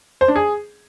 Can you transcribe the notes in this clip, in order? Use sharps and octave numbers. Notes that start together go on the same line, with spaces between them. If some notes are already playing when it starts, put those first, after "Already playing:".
C5
D4
G#4